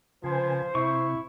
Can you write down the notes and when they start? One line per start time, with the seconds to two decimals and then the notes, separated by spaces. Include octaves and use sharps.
0.23 C#3 F3 B4 C5 G#5
0.75 C3 E4 C#6